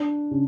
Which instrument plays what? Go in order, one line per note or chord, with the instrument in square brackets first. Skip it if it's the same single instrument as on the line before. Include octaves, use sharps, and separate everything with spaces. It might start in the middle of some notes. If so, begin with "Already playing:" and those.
Already playing: [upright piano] D4
C#3